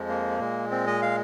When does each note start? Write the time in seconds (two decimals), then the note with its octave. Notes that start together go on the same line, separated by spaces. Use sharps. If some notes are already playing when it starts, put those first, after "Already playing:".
Already playing: F2 F3 G#3
0.09 A#3
0.39 A#2 G#3
0.71 C4
0.87 D#5
1.02 F5